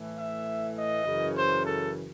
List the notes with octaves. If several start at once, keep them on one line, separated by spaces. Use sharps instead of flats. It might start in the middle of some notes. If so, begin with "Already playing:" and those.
Already playing: A2 E3 A3
E5
D#5
F#2 C#3 E3
C5
A4